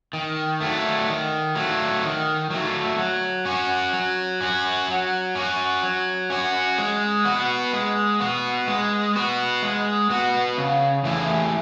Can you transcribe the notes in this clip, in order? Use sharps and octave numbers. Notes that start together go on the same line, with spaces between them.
D#3
F#3 A3
D#3
F#3 A3
D#3
F#3 A3
F#3
C#4 F#4
F#3
C#4 F#4
F#3
C#4 F#4
F#3
C#4 F#4
G#3
B3 F#4
G#3
B3 F#4
G#3
B3 F#4
G#3
B3 F#4
C#3
E3 A3 E4 G#4